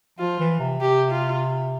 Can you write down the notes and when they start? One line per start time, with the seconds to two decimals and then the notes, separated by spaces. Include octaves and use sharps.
0.19 F3 F4
0.39 E3
0.60 C3
0.81 G4
1.11 F4